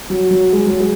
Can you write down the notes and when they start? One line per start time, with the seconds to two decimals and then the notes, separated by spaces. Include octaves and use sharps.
0.10 F#3
0.31 F#3
0.53 G#3
0.67 F#3
0.80 G#3